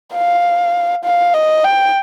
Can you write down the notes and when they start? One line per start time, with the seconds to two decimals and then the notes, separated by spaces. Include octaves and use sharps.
0.14 F5
1.05 F5
1.34 D#5
1.64 G5